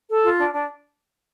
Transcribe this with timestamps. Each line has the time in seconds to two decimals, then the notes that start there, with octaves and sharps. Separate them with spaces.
0.09 A4
0.23 F4
0.38 D4
0.53 D4